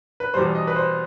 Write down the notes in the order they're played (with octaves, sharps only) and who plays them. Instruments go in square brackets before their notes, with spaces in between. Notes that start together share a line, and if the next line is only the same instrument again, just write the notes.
[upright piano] B4
E2 B2 G3 C5
D#5
B4
C5